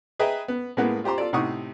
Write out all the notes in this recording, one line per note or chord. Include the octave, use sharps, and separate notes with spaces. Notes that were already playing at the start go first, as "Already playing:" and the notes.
G#4 B4 D#5 E5 G5 A#5
B3
A2 G#3 A#3 B3 F#5
F4 G4 C5 A#5 C6
F4 A4 D5
A2 C3 D#4 F#5 C#6 D#6